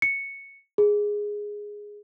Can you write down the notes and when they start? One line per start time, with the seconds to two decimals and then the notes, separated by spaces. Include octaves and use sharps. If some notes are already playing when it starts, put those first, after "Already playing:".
0.02 C#7
0.78 G#4